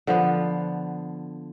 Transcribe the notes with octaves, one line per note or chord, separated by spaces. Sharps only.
D3 F3 B3